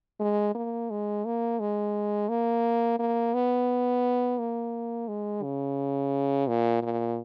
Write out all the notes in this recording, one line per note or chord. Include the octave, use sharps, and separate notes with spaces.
G#3
A#3
G#3
A#3
G#3
A#3
A#3
B3
A#3
G#3
C#3
A#2
A#2